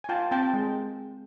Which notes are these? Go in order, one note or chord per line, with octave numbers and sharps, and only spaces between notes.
G#5
F4 G5 A5
C4 G5 A5
G#3